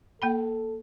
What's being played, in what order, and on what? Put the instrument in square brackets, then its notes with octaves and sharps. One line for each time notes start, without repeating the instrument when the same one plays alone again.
[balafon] A#3 G5 B5 [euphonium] A4